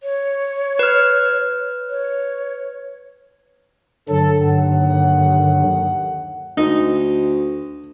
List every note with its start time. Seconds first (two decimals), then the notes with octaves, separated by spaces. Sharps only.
0.03 C#5
0.79 B4 F6
1.90 C#5
4.09 G2 D3 F#3 A4
4.41 D#2 F#5
6.57 D2 D#4